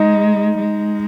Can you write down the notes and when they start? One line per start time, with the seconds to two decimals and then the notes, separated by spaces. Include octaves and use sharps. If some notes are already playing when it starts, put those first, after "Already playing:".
Already playing: G#3 D#4
0.58 G#3